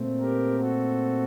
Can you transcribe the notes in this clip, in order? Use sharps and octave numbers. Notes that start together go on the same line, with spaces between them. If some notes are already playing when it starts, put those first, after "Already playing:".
Already playing: A#2 A3 C4
G4 A#4
F#4 A4